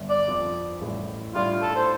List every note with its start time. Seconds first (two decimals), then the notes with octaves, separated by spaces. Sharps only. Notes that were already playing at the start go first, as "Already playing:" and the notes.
Already playing: G1 G2 G3
0.10 D5
0.27 F2 F3 C4
0.81 A1 A2 G3
1.34 A2 G3 D4 F4 G4
1.62 A4
1.76 C5